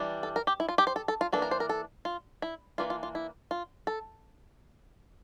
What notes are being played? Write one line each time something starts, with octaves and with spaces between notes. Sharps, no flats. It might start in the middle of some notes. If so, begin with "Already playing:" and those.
Already playing: E3 G3 D4
A4
A#4
G4
E4
F4
G4
C5
A4
A4
F4
E3 A#3 D4 A4
A#4
C5
A#4
A4
F4
E4
E3 A#3 D4 F4
F4
F4
E4
F4
A4